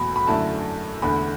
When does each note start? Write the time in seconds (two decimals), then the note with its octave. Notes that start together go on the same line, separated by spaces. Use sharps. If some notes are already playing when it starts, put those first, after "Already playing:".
Already playing: E2 B2 F#3 A3 B5
0.16 B5
0.27 F#2 D3 A3 E4 A5
1.02 E2 D3 A3 B5